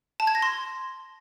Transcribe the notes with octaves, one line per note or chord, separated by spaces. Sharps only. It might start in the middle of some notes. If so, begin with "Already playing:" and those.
A5
G#6
A#6
C6